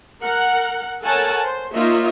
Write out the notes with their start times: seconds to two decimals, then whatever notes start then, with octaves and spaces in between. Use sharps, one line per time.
0.23 A#4 F#5
1.02 A4 A#4 C#5 F#5 G#5 A5
1.43 C5
1.73 A#3 D#4 F4 C#5 D#5 E5